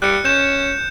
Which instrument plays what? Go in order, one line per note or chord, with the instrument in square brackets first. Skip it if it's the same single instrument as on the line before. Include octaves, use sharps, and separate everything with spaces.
[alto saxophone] G3 [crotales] F#6 C#7
[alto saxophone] C#4 [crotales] F#6 G6 E7